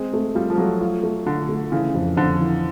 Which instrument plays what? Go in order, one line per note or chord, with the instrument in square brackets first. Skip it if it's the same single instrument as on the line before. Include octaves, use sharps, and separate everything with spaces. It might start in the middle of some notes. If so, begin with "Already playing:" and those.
Already playing: [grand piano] G#3 [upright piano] C4
[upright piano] A3
[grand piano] G3 [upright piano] F4
[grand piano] F3
[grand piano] F#3 [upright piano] A3
[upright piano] F4
A3
[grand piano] D3 [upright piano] F4
[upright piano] A3
[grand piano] C#3 [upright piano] E3
[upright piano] F2
[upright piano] F2 [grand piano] D3
[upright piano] E3